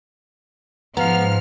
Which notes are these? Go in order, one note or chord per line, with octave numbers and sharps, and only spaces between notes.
G#2 F3 B3 F5 A#5 F6